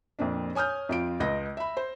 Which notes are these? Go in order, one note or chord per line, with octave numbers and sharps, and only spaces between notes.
F2 A#2 C4 D4
C#5 G#5 D#6 F6 G6
F2 F4 D7
C#2 D#5 A#6
E5 B5
C5